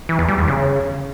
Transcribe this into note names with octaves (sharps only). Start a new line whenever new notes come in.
E3
E2
G3
E2
C#3